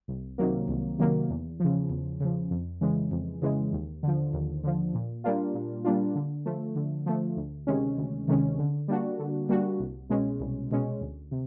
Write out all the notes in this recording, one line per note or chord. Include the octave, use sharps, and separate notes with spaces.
C2
C3 D#3 F#3 A#3
C2
C3 D#3 F#3 A#3
E2
C#3 F3
E2
C#3 F3
F2
C#3 E3 G#3
F2
C#3 E3 G#3
D#2
D3 F3
D#2
D3 F3
A#2
G3 A#3 D4 F4
A#2
G3 A#3 D4 F4
D3
F3 A3
D3
F3 A3
D2
C3 D#3 G#3 C#4
D2
C3 D#3 G#3 C#4
D3
G3 A#3 D4 F#4
D3
G3 A#3 D4 F#4
C2
B2 G#3 C#4
C2
B2 G#3 C#4
D2
C3